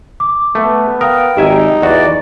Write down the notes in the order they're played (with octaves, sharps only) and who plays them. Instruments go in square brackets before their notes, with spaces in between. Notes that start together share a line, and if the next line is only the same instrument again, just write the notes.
[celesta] D6
[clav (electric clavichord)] A3 [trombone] B3
[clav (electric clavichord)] A#4 [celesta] F5 D#6 [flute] G5
[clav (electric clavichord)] G#1 E5 G#5 [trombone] D#4 [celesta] G4
[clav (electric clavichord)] E2 F#4 [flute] D5